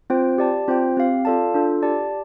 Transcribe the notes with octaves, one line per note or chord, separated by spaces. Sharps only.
C4 F4 C5 G5
G4 D5 A5
C4 F4 C5 G5
C4 G4 F5
F4 A4 D5 F5 A5
D4 F4 A4
G4 D5 A5